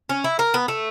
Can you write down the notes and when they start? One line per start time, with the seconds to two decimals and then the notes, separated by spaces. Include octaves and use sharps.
0.09 C#4
0.24 E4
0.39 A#4
0.54 B3
0.68 A3